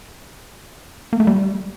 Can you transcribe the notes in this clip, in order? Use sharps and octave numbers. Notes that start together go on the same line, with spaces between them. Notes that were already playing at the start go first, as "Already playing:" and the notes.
A#3
A3
G3